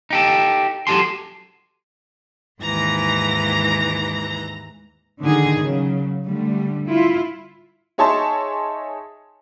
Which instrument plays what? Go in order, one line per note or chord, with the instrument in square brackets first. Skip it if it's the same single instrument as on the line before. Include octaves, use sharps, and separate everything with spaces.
[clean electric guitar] D#4 G4 A4
F#3 D4 G4 A4 A5 C6
[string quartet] D#2 G#2 E3 A#5 A#6
[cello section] D3 D#3 D#4 G#4
C#3 F#3
D3 G3 A3
E4 F4
[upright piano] D#4 G#4 C#5 E5 A5 C6